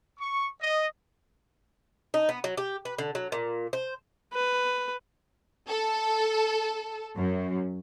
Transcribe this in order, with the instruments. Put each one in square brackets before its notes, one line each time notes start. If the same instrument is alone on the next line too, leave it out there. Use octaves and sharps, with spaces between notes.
[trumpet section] C#6
D#5
[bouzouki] D#4
B3
F#3
G4
B4
D3
F#3
A#2
C5
[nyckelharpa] B4
[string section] A4
F#2